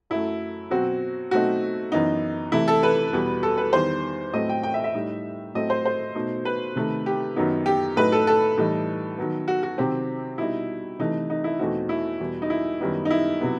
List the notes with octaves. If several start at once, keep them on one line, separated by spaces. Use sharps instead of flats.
F#2 F#3 A3 E4
B2 F#3 C4 F#4
B2 F#3 A3 C4 D#4 F#4
F#2 E3 B3 D#4
C3 E3 A3 E4
A4
B4
E2 B2 G3 B3
A4
B4
E2 D#3 G3 C5
A2 F#3 A3 C4 D#5
G5
G5
E5
E5
A2 G3 D#4
A2 F#3 A3 C4 D#5
C5
C5
B2 A3 D#4
B4
C3 D#3 A3
G4
F#2 D#3 F#3 B3 D#4
G4
A2 F#3 A3 D#4 B4
A4
A4
A2 E3 G3 D#4
D#3 F#3 B3
F#4
F#4
C3 D#3 F#3 C4 G4
B2 G3 D#4 E4
C3 E3 A3 D#4
D#4
E4
E2 B2 A3 C4 D#4 F#4
E4
E2 B2 G3
D#4
E4
F#2 D#3 G3 B3 D#4
D#4
E4
C3 F#3 B3